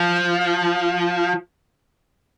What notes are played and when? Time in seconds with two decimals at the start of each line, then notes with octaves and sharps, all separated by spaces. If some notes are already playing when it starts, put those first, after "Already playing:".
Already playing: F3